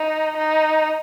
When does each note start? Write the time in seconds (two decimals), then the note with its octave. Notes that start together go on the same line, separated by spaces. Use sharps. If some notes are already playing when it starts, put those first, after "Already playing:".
Already playing: D#4
0.37 D#4